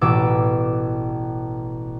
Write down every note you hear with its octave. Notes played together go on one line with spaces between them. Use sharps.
A1 B2 D6 E6